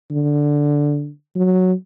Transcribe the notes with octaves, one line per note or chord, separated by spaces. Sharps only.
D3
F#3